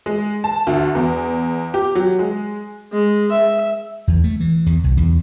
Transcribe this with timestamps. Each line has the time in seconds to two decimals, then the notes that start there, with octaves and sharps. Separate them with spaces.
0.06 G#3
0.44 A5
0.67 D2
0.95 E2
1.74 G4
1.95 F#3
2.19 G#3
2.93 G#3
3.32 E5
4.08 E2
4.24 A3
4.40 E3
4.66 E2
4.84 C2
4.97 E2